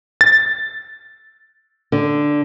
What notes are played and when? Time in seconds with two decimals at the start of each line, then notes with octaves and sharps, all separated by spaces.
0.21 A6
1.92 D3